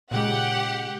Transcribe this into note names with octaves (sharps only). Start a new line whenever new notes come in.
A#2 C#3 G#3 G4 F#5